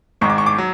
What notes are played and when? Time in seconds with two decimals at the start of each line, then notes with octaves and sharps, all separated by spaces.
0.21 G#1 G#2 G#3 C#6
0.30 D6
0.38 C#6
0.46 D6
0.58 F#3